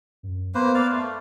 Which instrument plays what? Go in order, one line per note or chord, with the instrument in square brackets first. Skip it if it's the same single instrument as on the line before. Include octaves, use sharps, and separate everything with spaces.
[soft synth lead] F#2
[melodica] A#3 B4 C5 [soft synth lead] B3
[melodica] D5 F5
[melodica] A3 [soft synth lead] C6